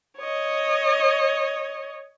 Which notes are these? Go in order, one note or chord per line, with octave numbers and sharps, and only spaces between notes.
C#5 D#5